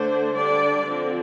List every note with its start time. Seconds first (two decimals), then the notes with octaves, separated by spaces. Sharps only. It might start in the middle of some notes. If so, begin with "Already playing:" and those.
Already playing: D3 A3 D4 C5
0.35 D3 G3 D4 D5
0.88 D3 F3 C4